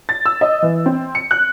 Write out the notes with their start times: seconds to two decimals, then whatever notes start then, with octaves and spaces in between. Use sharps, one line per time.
0.09 A6
0.26 E6
0.41 D#5
0.62 E3
0.86 C4
1.15 C#7
1.31 F#6